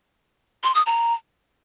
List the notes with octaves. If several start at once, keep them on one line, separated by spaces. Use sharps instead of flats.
C6
D#6
A#5